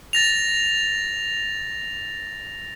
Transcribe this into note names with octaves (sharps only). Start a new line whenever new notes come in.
A6 A#6 F7